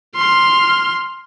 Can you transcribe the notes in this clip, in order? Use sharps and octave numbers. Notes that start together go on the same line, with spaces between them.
C6 F6